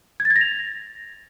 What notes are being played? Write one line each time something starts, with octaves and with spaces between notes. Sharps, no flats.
G#6
A6
G#6
A#6
F7